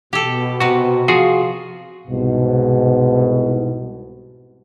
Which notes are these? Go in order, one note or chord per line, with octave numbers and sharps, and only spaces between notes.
B2 G4 A4
C3 F#4 B4
F3 F4 F#4 G#4
C2 G#2 B2